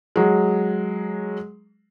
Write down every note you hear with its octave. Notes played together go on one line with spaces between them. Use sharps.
F#3 G#3